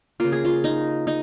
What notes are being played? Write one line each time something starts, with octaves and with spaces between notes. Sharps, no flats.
C#3 A#3 F4
G#4
F4
D#4
D#4